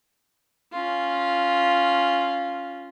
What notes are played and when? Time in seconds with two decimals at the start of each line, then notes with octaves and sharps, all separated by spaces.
0.72 C#4 F4